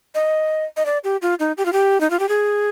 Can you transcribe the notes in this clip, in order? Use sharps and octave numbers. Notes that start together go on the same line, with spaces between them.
D#5
D#5
D5
G4
F4
D#4
G4
F4
G4
D#4
F4
G4
G#4